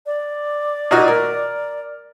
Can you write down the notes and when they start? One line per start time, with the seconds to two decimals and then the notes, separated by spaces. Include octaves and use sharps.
0.06 D5
0.91 A#2 D#4 F#4
1.08 A#4